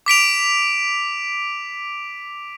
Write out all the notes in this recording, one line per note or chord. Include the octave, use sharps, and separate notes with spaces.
D6 B6 D7 F7